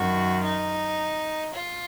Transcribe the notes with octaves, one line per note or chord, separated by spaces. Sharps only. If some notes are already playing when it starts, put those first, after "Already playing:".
Already playing: F#2 D#3 F#4
D#4
F4